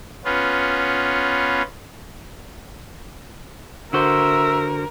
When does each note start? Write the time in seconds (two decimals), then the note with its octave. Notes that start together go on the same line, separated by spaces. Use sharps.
0.24 B3 C#4 F4
3.93 D3 F#4 A#4 C5 E5